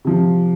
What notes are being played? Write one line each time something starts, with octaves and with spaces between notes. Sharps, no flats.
C3 F3